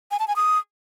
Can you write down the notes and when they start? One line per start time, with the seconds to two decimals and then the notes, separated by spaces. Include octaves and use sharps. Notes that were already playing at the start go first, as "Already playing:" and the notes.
0.11 G#5
0.19 A5
0.28 G#5
0.36 D#6